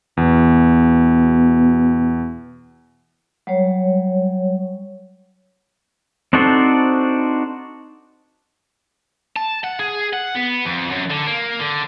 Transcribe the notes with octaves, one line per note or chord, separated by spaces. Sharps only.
E2 B2
F#3 G3 C#5
C4 D4 D#4 F#4 A4 C5
A5
F#5
G#4
F#5
B3
F2
F#2
D3
A#3
D3